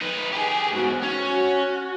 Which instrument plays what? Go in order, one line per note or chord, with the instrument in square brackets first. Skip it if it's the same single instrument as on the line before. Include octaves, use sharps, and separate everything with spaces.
[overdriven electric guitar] D#4 B4
[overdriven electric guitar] G4 G#4 [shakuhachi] G#5
[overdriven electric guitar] B1 G#2 [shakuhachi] F#4
[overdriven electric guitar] C#4
[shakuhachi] F#4